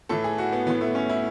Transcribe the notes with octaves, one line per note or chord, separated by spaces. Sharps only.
A2 E3 A4
G#4
F#4
B3
A2 E3 B3
A3
C#4
E4